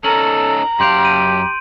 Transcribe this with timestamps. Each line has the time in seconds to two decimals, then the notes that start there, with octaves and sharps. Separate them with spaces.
0.04 C#4 D#4 A4 A#5 F#7
0.80 F#2 G4 F5 C6 G6 D7
1.05 D#7